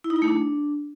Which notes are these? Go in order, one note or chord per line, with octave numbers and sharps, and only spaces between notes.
E4
D#4
E4
A3
D4